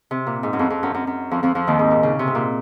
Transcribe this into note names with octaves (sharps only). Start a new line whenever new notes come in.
C3
A#2
G#2
F#2
F2
F2
F#2
F#2
F#2
F2 F3
F2 F3
F2 F3
D#2 D#3
G#2
A#2
C#3
C3
G#2
A#2